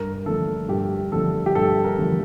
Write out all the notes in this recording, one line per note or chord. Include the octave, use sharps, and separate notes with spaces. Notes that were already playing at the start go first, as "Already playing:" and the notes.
Already playing: G2 A#4
D3 F3 A3 A4
G2 G4
D3 F3 A3 A4
G4
G2 A4
A#4
D3 F3 A3